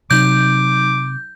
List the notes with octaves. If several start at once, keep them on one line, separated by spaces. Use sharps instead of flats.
C3 F#3 D#4 D6 G6